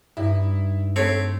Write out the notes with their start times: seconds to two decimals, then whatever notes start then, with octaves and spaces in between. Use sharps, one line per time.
0.17 G2 D#4 E4
0.96 A3 C4 A4 C#5 E6 B6 C7